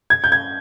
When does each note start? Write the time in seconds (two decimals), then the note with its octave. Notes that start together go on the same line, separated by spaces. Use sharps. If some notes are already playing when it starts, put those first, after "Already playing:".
0.10 G#6
0.24 G6
0.32 G#6